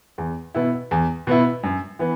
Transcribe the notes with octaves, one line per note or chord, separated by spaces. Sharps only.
E2
B2 B3 E4
E2
B2 B3 E4
F#2
E3 B3